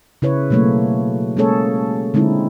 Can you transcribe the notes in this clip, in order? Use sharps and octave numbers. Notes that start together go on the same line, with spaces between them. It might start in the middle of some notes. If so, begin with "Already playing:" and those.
C#3 E4 B4 C#5
B2 F#3 A3 A#3 C#5
G#3 A#3 C#4 G#4 A4 C#5
D3 G#3 C4 D#4 E4